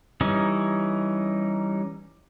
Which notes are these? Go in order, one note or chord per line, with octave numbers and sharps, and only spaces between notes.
E3 G3 C#4 D#4